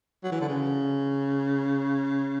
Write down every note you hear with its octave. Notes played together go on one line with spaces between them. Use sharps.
F#3
E3
D3
C#3